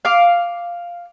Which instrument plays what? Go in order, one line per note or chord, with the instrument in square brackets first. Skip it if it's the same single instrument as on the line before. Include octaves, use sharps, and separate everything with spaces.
[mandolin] F5 D6